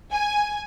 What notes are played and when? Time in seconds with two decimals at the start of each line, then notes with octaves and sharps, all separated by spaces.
0.12 G#5